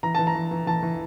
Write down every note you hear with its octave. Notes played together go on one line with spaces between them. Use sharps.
E3 A#5
E3 A5
A#5
E3
E3
E3 A5
E3